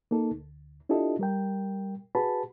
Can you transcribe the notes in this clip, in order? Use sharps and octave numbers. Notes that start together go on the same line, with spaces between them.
A#3 D#4 A4
D2
D4 E4 F4 G4 A4 D#5
G3 A#4 G5
F#4 G#4 B4 A5 B5